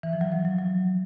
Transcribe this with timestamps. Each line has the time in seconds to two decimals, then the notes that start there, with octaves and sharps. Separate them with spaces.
0.03 E3
0.13 F3
0.21 F#3
0.32 F3
0.45 F#3
0.58 F#3